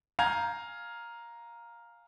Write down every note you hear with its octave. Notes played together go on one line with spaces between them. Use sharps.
F5 G#5 A#5 G6 G#6